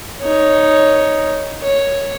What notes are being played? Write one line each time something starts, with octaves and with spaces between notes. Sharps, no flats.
D#4 C#5
C#5